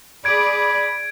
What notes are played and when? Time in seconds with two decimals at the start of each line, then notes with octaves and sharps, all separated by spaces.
0.25 G#4 D5 B5 G#6 D7